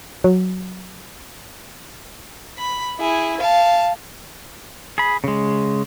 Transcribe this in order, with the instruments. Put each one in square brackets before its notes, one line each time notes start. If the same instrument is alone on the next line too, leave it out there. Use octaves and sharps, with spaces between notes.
[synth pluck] F#3
[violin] B5
E4 G#4
F5 A5
[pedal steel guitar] G#4 B5
C#3 G#3